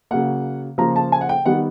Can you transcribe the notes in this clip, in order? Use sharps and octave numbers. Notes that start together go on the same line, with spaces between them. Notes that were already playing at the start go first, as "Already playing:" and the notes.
C#3 F#3 A#3 F#5
C#3 F3 A#3 A#5
A5
G#5
F#5
G5
D#3 G3 B3 F#5